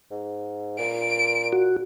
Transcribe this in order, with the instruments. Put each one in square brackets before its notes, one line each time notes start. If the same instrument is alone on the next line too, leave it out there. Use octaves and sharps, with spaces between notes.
[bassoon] G#2
[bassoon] A#2 [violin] D7
[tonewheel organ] F#4